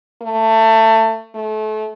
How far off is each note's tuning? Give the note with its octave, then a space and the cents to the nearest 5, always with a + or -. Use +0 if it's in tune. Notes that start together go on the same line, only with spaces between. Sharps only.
A3 +20
A3 -30